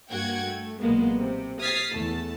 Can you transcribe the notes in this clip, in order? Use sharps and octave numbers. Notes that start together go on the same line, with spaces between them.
G2 A#3 F#4 F#5 G5 G#6
A3
B1 A#2 G#3 A#3 B3
C3
D#6 F6 G#6 A6 B6 C7
E2 A3 A5